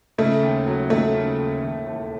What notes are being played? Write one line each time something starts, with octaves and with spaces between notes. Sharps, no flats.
C#3 A3
D#2
F#3
D#2 A3
C#3
D#2
D#2
E1